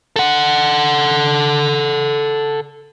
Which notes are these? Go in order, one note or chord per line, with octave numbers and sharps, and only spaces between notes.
A4 F#5